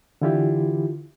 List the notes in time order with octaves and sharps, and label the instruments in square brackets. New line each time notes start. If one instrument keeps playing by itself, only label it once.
[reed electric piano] D3 E3 E4 F4 G4